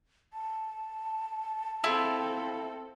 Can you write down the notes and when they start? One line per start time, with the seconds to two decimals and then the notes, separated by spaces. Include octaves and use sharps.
0.33 A5
1.84 C4 E4 F4 A4